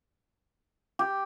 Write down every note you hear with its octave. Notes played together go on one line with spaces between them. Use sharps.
G4